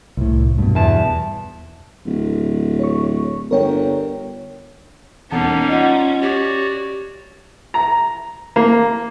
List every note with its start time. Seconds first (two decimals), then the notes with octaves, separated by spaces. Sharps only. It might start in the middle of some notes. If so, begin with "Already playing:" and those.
0.17 C2 A2
0.58 G2 B2
0.75 E2 A5
2.06 D1
2.79 C#5 C#6
3.51 G1 A#4 C#5 G5
5.31 E1 G3 A#3 B3 C#4 D#4 F#5 A5
5.69 F4 D#5 F#5
6.21 F#4 G4 C#5 D5
7.74 A#5
8.56 A#3